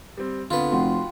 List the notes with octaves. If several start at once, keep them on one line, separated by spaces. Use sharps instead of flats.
G3 C4
D3 B3 C4 F4 A4 B4
F1 F#4 F#5 G5 C6